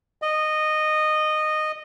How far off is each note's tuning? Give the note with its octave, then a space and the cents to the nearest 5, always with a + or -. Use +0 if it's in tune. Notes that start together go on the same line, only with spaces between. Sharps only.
D#5 -15